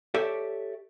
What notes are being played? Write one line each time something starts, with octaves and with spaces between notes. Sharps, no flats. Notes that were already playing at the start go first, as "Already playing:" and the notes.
G4 A4 C#5 D5 E5